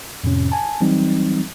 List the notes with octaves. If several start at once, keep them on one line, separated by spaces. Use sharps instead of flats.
F2 A2 C3 C#4
G#5 A5
E3 F#3 G3 C4 D#4